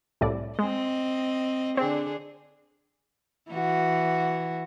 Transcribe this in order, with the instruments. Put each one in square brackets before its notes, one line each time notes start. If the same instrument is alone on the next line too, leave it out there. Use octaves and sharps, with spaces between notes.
[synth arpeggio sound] C2 A2 D5
[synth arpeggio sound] G#3 [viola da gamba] C4 D#5
[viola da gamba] D3 D4 G#4 [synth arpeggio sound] C4
[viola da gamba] E3 F#4